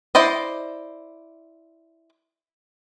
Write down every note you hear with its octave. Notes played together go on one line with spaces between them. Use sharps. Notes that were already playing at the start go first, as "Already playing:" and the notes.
E4 C5 D5 D#5